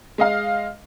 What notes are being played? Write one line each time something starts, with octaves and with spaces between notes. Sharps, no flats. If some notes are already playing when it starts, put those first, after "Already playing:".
G#3 D#5 F5